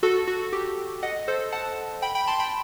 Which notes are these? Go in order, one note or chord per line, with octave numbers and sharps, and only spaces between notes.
F#4 A4
F#4
G4
D#5 F#5
A4 C5
F#5 A5
G5 B5
G5 B5
A5 C6
G5 B5